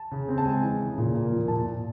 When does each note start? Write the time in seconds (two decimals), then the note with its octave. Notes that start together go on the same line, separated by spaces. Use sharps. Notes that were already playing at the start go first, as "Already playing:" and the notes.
Already playing: A5
0.12 C#3
0.29 C4
0.38 A5
0.45 G#3 G#5
0.63 E3
0.80 C#3
0.98 A#2
1.14 A#3
1.31 F3
1.48 A#2 A5
1.66 A#2